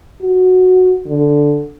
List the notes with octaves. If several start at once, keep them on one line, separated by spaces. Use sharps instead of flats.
F#4
D3